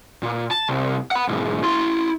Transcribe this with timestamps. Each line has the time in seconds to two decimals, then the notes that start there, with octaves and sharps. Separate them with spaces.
0.23 A#2
0.51 A5
0.69 C2
1.11 F#5 B5
1.28 B1 G#2
1.63 E4 C6